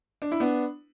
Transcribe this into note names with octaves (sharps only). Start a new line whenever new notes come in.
D4
E4
B3 D4